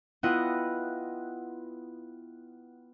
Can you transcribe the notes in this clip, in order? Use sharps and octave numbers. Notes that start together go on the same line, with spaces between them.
B3 E4 F4 D#5 F#5 G5